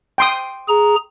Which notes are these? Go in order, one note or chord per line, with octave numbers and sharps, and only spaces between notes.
G5 C6 D#6
G#4 A#5